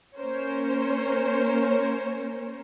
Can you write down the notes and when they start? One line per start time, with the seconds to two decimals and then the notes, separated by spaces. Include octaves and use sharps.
0.17 A#3 C#4 A#4 C5 C#5